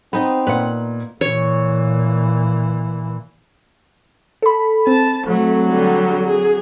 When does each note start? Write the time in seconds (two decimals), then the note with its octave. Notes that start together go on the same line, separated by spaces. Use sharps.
0.13 B3 C4 D#4
0.47 A#2 B4 F#5
1.21 A#2 E3 C#5
4.42 A4 B5
4.87 C4 A5
5.27 F#3 A3
5.68 D3 G3
6.26 G#4